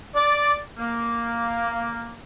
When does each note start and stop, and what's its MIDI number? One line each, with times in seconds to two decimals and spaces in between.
0.15 0.55 74
0.79 2.14 58